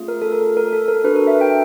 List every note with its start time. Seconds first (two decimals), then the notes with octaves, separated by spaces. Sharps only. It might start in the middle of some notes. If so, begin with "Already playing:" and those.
Already playing: A3 C#4 F4 G#4
0.08 A#4
0.22 A4
0.32 A#4
0.57 A#4
0.73 A4
0.88 A#4
1.04 D4 F#4 A4 B4
1.16 A#4
1.27 E5
1.41 G5